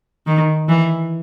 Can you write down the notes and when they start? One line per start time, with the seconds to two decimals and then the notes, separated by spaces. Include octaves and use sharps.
0.27 D#3
0.69 E3